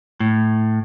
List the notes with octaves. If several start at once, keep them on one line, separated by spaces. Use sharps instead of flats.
A2